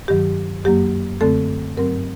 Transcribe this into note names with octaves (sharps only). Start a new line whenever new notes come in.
G2 D#3 F#3 G4
F#2 F#3 A#3 G4
F#2 D3 A3 C4 A4
G2 F#3 C4 A#4